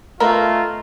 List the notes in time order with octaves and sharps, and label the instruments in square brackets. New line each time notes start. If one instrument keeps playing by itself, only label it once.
[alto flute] A3 [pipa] B3 A#4 [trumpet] F4 [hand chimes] D#5 A#5